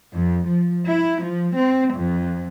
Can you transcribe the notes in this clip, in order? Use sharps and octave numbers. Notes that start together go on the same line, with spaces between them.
F2
F3
E4
F3
C4
F2